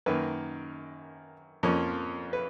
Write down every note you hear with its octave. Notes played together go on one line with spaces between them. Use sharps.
F#2 D#3 A#3 B4
F2 F3 A#3 C#4
B4